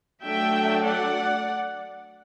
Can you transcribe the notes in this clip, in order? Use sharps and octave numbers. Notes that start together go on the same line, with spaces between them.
F#3 A3 D4 E5 G5
D5 F#5